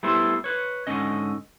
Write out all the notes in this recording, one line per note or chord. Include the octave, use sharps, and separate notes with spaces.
G3 A3 B3 E4 C5
B4 C#5
G#2 D3 C#4 D#5